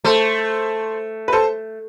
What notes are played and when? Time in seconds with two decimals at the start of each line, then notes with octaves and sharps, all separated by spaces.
0.04 A3 A4 C5
1.28 B4
1.33 A4 C5